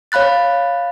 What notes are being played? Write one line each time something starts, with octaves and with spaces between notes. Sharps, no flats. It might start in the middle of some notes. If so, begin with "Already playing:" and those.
C#5 F5 B5 F#6 A6